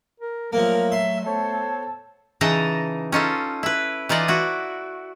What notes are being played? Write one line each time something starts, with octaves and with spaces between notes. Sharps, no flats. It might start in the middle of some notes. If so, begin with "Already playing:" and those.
A#4
F3 F#3 A3 A#3 A#4
E5 C6
B3 A4 C5 C#5
C#3 E3 D#4 D#5 A5 A#5
C#4 D#4 F4 A4
E4 B4
E3 D#4 F4 D5 D#5
E4 F#4